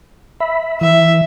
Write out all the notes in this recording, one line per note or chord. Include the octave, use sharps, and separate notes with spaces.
E5 B5
E3 E5